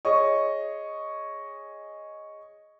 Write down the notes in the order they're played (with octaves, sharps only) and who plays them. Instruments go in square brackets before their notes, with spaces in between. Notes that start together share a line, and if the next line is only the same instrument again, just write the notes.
[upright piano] G#4 C#5 D#5 C#6